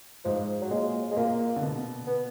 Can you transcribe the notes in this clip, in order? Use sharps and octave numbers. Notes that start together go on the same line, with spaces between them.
G#2 F3
F#3
A#2 G#3
G#3
A#2 A#3
D3
B2
B3